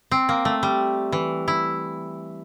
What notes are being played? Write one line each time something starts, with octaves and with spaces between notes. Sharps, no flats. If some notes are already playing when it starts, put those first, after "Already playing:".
C4
A#3
A3
G3
E3
E4